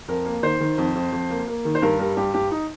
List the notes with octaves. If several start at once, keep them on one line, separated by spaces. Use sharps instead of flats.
F2 A#4
A#3
D#3 C5
D#3
F2
F2
F2
A#3
A#3
D#3
C5
G2 A#4
G3 A#4
G2 G4
G2 G4
D#4